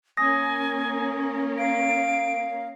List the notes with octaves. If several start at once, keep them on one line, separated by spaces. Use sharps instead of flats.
A#3 C#4 A#4 G#5 D#6 A#6
F5 D7